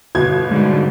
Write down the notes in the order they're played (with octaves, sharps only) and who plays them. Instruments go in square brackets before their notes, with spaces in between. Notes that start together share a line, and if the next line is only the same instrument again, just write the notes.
[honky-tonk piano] G1 B2 G#6
[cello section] G#2 D3 G3